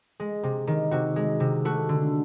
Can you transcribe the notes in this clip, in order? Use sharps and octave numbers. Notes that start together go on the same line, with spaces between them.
G#3
C3
D#3
C3 F#4
G#3
C3
A3 F#4
D3